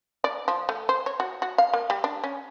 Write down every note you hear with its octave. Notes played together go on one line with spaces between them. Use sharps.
D5
F3
A3
C5
C#5
F#4
F#4
F5
A#3
G3
D4
C#4